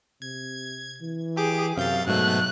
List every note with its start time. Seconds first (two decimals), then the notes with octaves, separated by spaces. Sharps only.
0.22 C3 G#6
1.01 E3
1.37 G4 G#4 D6
1.77 F#2 C3 F5 G6 A6
2.07 G#2 B2 F#3 A3 F#6